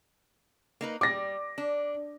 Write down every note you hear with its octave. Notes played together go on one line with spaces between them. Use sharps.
A#3 D#4 B4
G3 D6 A#6
D4